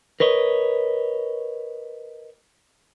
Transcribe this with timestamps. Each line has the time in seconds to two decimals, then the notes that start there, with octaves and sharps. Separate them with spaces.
0.20 A#4 B4 C#5 D#5